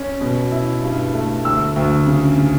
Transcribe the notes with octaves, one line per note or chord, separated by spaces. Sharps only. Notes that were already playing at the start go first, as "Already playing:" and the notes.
Already playing: C#4
B2
E4
G2
A3
D2 E6
D2
C#3
C#3